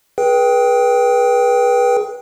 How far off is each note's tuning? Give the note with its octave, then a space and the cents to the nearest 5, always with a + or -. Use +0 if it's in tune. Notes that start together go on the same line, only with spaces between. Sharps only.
G#4 +20 B4 -25 G5 +0